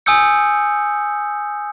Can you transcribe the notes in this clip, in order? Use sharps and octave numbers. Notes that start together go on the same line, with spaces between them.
G#5 D#6 E6 G6 C#7